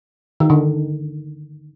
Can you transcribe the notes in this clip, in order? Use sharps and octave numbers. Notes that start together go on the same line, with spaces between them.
D#3
D3